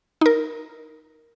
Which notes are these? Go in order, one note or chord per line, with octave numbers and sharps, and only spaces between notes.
D#4 A#4